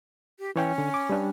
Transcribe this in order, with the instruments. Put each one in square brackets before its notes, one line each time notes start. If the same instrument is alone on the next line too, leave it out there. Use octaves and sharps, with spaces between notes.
[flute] G4
[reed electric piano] E3 C#5 G5 [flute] C#4
[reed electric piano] D3
D6
G3 D4